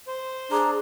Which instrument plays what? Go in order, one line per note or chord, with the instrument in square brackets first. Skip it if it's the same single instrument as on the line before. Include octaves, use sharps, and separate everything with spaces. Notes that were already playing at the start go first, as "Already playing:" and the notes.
[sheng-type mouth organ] C5
[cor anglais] D4 [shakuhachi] G#4 [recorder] A#5